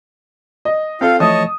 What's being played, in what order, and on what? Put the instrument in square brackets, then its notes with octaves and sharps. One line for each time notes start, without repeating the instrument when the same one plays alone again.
[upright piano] D#5
[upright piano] C4 A4 [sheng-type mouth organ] F4 F5
[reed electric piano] E3 F3 A3 [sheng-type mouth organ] C#5 D#5 A5 [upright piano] D#6